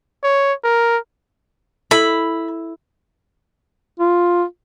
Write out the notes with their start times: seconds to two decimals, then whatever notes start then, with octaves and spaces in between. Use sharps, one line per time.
0.23 C#5
0.64 A#4
1.91 E4 A4 B5
4.00 F4